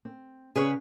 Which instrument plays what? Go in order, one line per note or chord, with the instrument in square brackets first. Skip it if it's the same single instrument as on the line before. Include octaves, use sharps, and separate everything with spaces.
[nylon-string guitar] C4
[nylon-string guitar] C#3 [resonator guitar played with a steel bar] G#4 B4 C#5